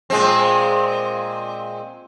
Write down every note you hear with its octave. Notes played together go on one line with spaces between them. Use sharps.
A#2 G#3 C4